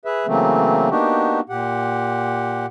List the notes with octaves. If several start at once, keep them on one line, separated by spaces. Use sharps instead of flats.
G#4 B4 E5
C#3 E3 F#3 A3 A#3 C4
A#3 B3 D4 D#4 F#4 G4
A#2 G4 F#5